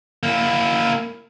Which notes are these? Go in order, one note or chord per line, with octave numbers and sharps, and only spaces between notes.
A#3 E4